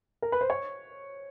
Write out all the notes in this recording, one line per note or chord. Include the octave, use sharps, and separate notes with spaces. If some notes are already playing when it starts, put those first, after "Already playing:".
A#4
B4
C5
C#5